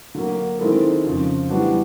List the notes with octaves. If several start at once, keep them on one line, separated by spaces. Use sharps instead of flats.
D3 F#3 A#3
D#3 G#3 C4 E4 A4
F2 C#3 F3
E3 G3 B3 D4 F#4